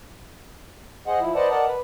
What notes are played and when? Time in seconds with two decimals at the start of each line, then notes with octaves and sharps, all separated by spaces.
1.07 G#4 C5 D#5 F#5
1.19 F3 E4
1.35 B4 C5 D5 D#5 F#5 A5
1.51 A#4 D5 D#5 F#5 A5 A#5
1.66 B4